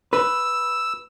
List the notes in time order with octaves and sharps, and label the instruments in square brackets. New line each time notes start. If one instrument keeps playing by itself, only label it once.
[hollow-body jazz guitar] B4 [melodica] E6